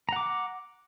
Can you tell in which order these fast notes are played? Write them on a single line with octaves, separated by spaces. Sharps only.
A#5 F#5 D6